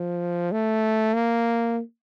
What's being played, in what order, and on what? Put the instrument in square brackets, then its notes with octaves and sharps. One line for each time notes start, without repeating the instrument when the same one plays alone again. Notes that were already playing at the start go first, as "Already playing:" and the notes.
Already playing: [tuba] F3
A3
A#3